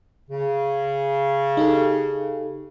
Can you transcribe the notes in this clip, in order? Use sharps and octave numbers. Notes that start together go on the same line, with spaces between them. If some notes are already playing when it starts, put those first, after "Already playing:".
C#3
D#4 G4 A4